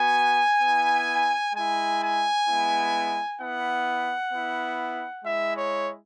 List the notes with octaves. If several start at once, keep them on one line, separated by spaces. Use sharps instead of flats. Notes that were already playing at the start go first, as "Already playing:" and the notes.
Already playing: B3 F#4 G#5
B3 E4
G#3 E4 G#5
G#5
G#3 B3 E4
B3 E4 F#5
B3 E4
G#3 E4 E5
C#5